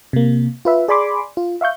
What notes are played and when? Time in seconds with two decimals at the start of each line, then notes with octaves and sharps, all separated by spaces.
0.13 C3 A#3
0.65 F4 B4 E5
0.88 G#4 D5 G#5 B5 C6 D6
1.37 F4
1.61 E5 F5 C#6 G6